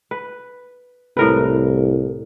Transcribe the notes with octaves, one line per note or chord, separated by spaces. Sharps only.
B4
C2 A2 A#4 B4